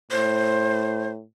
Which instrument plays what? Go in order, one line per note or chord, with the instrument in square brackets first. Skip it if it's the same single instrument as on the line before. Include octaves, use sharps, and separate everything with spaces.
[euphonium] A2 [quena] C5